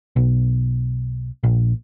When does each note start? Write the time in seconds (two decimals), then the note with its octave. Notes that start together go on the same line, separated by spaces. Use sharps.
0.16 B1
1.43 A#1